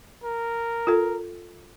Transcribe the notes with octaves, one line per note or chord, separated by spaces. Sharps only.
A#4
F4 A4